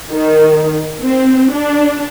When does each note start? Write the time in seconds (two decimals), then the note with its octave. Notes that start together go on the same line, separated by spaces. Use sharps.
0.12 D#3
1.01 C4
1.52 D4